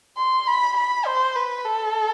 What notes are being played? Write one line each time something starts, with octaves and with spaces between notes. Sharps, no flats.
C6
B5
B5
C5
B4
A4